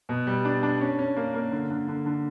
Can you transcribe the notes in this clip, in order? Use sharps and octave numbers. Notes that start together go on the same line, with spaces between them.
B2
G3
D4
D4
C#4
C#4
A#3
A#3
D3
D3
D3
D3